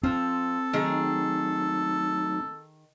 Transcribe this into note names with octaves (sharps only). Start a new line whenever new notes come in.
F3 C4 A4
D#3 F#3 A3 D#4 G#4